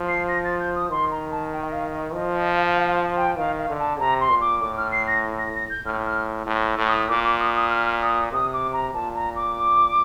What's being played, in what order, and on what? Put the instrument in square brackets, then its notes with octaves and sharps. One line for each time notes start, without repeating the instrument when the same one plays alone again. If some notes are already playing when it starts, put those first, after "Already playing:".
Already playing: [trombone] F3
[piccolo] C7
A#6
A6
G6
D#6
[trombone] D#3 [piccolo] C6
[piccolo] A#5
A5
G5
D#5
F5
D#5
[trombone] F3 [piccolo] D#5
[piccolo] D#5
F5
F5
G5
[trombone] D#3 [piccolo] F5
[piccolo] F5
[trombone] D3
[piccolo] A5
[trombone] C3 [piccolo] A#5
[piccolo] C6
[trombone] A#2
[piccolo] D6
[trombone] A2 [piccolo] D6
[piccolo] F6
C7
A#6
A#6
A#6
G6
[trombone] A2 [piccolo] F6
[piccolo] F6
[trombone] A2
A2
[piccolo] D#6
[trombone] A#2 [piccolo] D6
[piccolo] D6
D#6
D#6
F6
D#6
[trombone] C3 [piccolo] D#6
[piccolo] D6
A#5
[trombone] A#2 [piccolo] A5
[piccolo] A#5
D6